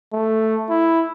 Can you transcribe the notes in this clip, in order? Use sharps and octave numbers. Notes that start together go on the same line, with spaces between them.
A3
E4